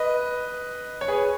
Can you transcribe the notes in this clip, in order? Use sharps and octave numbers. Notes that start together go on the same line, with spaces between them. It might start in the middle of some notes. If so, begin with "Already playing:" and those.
Already playing: B4 D#5
C#5
G#4 B4